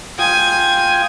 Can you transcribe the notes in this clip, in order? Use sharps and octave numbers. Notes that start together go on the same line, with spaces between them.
F4 G5 G#5 D#6